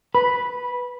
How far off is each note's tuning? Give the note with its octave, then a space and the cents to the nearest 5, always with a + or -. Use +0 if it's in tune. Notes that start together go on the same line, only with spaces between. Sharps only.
B4 +0 B5 -15